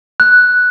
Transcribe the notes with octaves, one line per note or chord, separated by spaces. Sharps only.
F#6